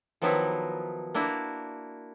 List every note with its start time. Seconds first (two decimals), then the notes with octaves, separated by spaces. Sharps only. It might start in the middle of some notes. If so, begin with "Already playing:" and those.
0.22 D#3 F3 F#3 B3 D#4 E4
1.14 A#3 D4 E4 F#4